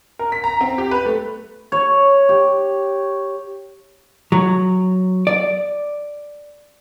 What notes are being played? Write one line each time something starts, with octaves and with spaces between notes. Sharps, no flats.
A#4
B6
A#5
C4
G4
B4
A3
C#5
G4
F#3
D5